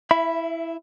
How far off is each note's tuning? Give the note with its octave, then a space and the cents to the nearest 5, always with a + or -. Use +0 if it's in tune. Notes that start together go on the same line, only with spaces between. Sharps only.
E4 +0 E5 +30 B5 +0